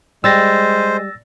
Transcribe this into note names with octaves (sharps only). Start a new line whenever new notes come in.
G3 G#3 C5 E6 A6 A#6